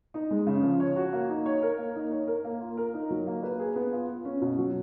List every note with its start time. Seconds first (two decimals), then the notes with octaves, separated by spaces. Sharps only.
0.14 D#4
0.31 G#3
0.47 C#3
0.63 F3
0.80 C#5
0.96 F#4
1.13 A#3
1.30 D#4
1.46 C#5
1.62 A#4
1.78 A#3
1.96 D#4
2.12 C#5
2.28 A#4
2.45 A#3
2.60 F4
2.77 A#4
2.94 D#4
3.10 F#3
3.27 A#3
3.43 B4
3.59 G#4
3.76 B3
3.93 F4
4.09 F4
4.25 C#4
4.41 B2
4.58 F#3